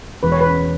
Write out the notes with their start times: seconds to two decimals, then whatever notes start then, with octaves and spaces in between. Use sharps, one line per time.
0.23 E1 B4
0.32 C#5
0.41 B4
0.46 C#4